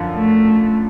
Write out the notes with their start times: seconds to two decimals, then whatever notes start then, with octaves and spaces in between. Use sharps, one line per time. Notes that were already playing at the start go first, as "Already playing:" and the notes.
Already playing: F#2 D3 F3
0.16 A3